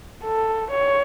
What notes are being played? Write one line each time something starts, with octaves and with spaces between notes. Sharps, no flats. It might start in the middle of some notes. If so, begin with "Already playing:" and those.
A4
C#5